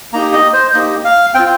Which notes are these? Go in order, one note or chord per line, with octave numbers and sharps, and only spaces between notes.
A#3 D#4 G4 A#5
D#5
C5
A#3 D#4 G4 D#5
F5
C4 F4 G5